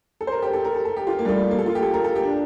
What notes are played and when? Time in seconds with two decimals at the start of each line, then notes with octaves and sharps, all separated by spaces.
0.21 A4
0.27 C5
0.32 A#4
0.42 G4
0.53 A4
0.65 A#4
0.75 A4
0.85 A4
0.97 G4
1.07 F4
1.19 A#3
1.25 G3
1.29 A3
1.51 A#3
1.59 A4
1.66 F4
1.75 G4
1.83 A4
1.94 A#4
2.04 A4
2.16 G4
2.23 D4